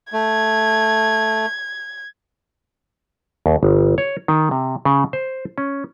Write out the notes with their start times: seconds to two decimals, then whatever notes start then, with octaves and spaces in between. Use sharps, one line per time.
0.13 A3 G#6
3.46 D#2
3.63 G1
3.98 C#5
4.28 D#3
4.51 C3
4.85 C#3
5.13 C5
5.58 C#4